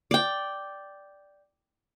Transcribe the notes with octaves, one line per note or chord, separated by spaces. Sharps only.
D5 G5